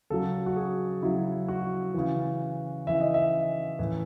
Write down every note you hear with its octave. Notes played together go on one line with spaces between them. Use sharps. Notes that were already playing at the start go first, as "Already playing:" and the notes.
C#3 F#3 A4
F#4
G#4
C#3 F#3 E4
F#4
C#3 E3
C#3 E3 E5
D#5
E5
A2 E3